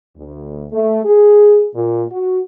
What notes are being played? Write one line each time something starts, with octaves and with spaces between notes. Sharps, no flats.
D2
A3
G#4
A#2
F#4